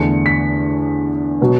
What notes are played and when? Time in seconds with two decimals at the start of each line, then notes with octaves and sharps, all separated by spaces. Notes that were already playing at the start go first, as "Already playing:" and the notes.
Already playing: E2 D3 A3 C#7
0.26 B6
1.41 B2 F#3 B3